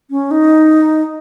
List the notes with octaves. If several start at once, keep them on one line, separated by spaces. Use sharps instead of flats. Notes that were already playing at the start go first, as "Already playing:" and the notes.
C#4
D#4